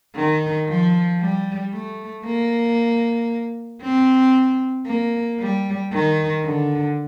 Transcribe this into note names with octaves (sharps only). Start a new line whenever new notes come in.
D#3
F3
G3
A3
A#3
C4
A#3
G3
D#3
D3